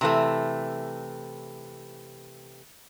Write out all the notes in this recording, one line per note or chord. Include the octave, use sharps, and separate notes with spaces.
C3 E3 A3